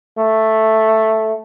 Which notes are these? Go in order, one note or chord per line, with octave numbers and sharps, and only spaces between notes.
A3